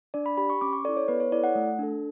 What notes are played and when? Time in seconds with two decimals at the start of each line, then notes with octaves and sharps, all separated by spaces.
0.14 D4 D5
0.26 B5
0.37 G4 B5
0.50 C#6
0.61 C#4 D6
0.73 C#6
0.85 A4 D5
0.88 E4
0.97 C#5
1.08 B3 B4
1.20 C#5
1.32 E4 A4 D5
1.44 F#5
1.55 A3
1.79 D4 A4